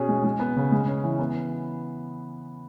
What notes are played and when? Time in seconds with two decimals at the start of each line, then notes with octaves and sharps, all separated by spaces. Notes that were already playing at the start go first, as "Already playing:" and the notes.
Already playing: B2 C#4 G#4
0.09 G#3
0.24 G#3
0.40 B3
0.57 C#3
0.72 G#3
0.87 C#4
1.04 E3
1.20 B3